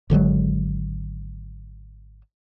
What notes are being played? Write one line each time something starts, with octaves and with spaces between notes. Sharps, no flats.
G#1 D3 F#3 G#3